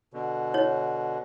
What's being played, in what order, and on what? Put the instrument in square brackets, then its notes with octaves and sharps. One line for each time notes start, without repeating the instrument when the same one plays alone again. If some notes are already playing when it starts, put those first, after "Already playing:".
[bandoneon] B2 D3
[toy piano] C#5